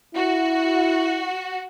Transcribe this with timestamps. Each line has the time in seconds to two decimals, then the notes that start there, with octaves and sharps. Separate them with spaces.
0.15 E4 F#4